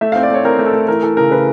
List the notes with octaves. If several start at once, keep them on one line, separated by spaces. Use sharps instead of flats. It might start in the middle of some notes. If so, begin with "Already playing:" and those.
A3 E5
F5
C4
D5
A3 C#5
C4 A#4
A3
A4
A3
E3 A#4
E3 A4
C#3 A#4
C#3 B4